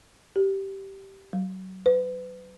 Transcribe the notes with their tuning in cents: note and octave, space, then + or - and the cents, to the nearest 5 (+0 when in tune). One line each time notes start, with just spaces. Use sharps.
G4 -10
F#3 +25
B4 +35